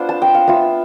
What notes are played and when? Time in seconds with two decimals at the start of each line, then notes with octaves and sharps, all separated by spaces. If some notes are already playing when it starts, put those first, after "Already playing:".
Already playing: B3 D4 F4 C5
0.09 A5
0.22 G5
0.34 F5
0.47 B3 F4 E5